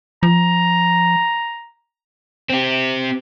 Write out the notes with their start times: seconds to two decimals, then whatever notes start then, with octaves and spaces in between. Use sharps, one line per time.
0.23 F3 A#5
2.49 C4 G4